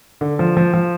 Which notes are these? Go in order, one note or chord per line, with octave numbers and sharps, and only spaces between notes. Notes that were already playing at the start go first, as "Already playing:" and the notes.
D3
F3
F3
F3